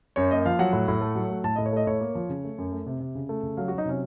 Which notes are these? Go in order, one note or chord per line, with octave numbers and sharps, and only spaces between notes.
F#2 C#5
A#3 D#5
F3 F5
F#3 F#5
A2
A2
A3
F#3
A3
A2 A5
A2 D#5
C#5
A3 D#5
A2 C#5
A#3
F3
C#3
A3
F#2
A3
C3
C3
C#3
A3
C#3
F#3 F5
F#3 F#4
D#4
C3 C#4